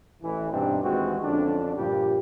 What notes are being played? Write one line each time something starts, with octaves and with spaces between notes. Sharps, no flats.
A1 E3
G2 B2 B3 C4 D4 D#4
D#2 E3 G#3 C4 F#4
F2 D3 C#4 D4
G2 A#2 F3 G3 G4